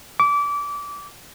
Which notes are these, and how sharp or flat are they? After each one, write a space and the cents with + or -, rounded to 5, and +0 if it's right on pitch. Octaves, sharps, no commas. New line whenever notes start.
D6 -25